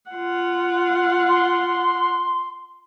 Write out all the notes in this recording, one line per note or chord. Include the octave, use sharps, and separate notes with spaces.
F4 F#5
C6